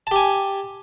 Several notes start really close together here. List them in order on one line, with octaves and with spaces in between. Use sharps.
A5 G4 G#5